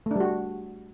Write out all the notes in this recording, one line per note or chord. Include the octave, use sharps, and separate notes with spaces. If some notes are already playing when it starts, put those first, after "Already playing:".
G3 A3 D4 F#4